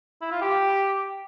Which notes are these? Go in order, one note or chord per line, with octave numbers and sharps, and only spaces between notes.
E4
F4
G4